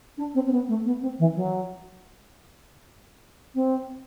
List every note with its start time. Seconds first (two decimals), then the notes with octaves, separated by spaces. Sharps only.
0.17 D4
0.34 C4
0.46 C4
0.51 B3
0.68 A3
0.85 B3
1.01 C4
1.19 E3
1.35 F#3
3.54 C4